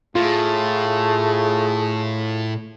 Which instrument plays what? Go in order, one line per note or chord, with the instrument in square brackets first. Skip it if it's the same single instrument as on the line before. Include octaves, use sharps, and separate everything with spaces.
[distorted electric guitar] A2 [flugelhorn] A3 [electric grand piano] F4 [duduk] G#4